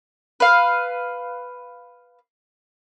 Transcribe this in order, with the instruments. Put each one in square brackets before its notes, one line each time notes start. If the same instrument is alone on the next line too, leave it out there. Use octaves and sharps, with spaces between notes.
[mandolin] B4 F5